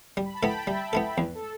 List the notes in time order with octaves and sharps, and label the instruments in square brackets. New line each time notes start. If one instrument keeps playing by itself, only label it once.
[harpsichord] G3
[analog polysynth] B5
A5
[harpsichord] B3 E4 A4 [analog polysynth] G5 B5
[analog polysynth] G5
[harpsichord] G3 [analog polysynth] E5 A5
[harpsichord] B3 E4 A4
[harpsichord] E2 [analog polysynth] B4
[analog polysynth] A4